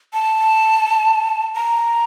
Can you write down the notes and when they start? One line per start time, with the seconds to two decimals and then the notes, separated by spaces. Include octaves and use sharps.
0.14 A5
1.56 A#5